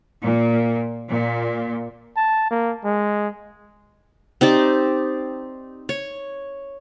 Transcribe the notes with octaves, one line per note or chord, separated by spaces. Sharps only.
A#2
A#2
A5
A#3
G#3
C4 D#4 G4 D5
C#5